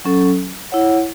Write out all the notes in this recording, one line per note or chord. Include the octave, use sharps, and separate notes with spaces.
F#3 C#4 A4
E4 C#5 F#5